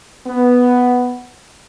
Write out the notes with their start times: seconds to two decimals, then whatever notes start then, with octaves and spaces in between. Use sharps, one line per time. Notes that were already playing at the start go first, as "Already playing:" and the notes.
0.26 B3